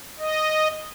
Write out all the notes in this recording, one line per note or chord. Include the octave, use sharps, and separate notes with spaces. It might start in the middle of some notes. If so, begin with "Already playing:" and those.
D#5